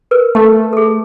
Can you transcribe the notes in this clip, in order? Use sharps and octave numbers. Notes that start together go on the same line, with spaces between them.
A#4 B4
A3 A5
G#4 A4